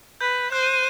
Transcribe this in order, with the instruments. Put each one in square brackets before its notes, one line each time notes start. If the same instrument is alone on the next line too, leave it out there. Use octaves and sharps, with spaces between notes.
[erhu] B4 [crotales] G6
[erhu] C5 [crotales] F#6
[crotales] D#7
D#7